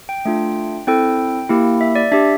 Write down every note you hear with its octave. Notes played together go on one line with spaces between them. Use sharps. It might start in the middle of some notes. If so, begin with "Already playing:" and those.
G5
A3 D4 F4
C4 E4 A4 G5
A#3 E4 G4
E5
D5
D4 G4 E5